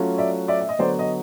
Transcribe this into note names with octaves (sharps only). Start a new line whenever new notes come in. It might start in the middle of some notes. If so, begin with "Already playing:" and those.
Already playing: F#3 A3 C#4 F4
D5 E5
D5 E5
E5
D#5
D3 F#3 B3 C5 D5
D#5